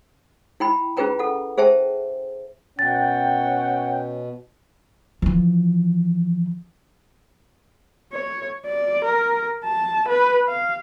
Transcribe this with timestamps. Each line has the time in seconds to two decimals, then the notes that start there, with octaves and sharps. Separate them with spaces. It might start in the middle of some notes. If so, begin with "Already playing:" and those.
0.60 E4 G5 B5
0.97 C#4 F4 G#4 B4 G5 A#5
1.19 A4 F#5
1.58 G#4 C5 E5 G5 A5
2.79 B2 C#4 F#5 G5 A6
5.22 E3 F3
8.12 C#5
8.65 D5
9.04 A#4
9.64 A5
10.08 B4
10.48 F5